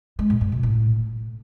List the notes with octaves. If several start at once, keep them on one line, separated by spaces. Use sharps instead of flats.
G#3
A#2
G2
B2
A2